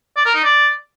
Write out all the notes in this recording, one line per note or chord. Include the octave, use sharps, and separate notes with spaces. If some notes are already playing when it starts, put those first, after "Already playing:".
D5
A#4
D#4
D5